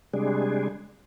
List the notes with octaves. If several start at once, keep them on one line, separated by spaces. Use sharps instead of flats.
C3 G3 G#3 D4 G#4